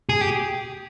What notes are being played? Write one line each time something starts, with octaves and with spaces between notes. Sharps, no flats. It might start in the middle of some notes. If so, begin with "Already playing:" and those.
G#4
G4